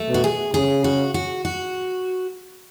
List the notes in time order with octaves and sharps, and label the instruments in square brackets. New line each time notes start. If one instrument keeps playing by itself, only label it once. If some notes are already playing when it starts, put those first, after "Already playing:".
Already playing: [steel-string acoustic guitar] A3
[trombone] B2
[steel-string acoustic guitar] F#4
G#4
[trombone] C#3 [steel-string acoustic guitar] G#4
[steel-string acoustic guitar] F#4
F#4
F#4